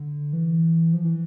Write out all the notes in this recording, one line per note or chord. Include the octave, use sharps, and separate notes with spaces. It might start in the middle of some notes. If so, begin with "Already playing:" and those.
Already playing: D3
E3
F3
E3